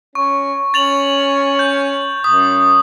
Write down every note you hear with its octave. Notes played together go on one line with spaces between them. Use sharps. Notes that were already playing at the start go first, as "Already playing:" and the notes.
C#4 C#6
C#4 A6 F7 F#7
G6
F#2 D#6